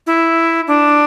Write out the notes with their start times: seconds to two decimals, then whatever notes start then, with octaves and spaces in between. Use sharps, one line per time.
0.07 E4
0.67 D4